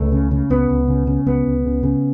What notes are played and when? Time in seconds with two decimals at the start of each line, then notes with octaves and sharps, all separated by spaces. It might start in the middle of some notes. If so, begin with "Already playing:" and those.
Already playing: C#2 A3
0.12 C#3
0.31 C#3
0.50 C#2 B3
0.70 C#2
0.88 C#3
1.07 C#3
1.27 C#2 B3
1.46 C#2
1.65 C#3
1.83 C#3